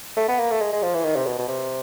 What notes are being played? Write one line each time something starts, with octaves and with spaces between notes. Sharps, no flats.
A3
B3
A#3
A3
G#3
G#3
F3
E3
D#3
C3
B2
B2
C3